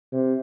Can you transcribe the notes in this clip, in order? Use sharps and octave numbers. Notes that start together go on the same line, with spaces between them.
C3